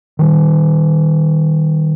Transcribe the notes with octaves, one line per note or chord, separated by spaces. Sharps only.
D#3 G3